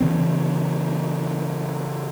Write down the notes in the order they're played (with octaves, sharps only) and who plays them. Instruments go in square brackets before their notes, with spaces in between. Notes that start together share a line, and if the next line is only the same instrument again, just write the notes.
[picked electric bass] C#3 E3 C4